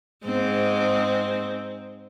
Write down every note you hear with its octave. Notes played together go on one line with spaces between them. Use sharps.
G#2 G#3 C4